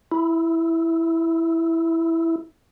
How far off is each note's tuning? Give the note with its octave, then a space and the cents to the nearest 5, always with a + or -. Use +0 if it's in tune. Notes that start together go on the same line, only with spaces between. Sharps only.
E4 +0